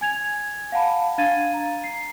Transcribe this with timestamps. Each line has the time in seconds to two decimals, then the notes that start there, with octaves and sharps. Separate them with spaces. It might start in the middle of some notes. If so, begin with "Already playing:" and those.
0.01 G#5 G#6 F7
0.72 F5 F#5 A5 B5
1.18 D4 F5 G#6 A6 D#7
1.54 A#5
1.84 C7